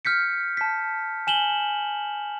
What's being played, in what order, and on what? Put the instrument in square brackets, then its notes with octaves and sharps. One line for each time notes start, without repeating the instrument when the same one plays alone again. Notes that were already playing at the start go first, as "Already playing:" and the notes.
[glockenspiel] F6 G6 B6 C#7
A5 B6
G#5 E7 F#7 G7